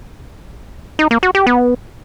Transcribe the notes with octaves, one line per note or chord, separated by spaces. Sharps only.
D#4
A#3
F#4
G4
B3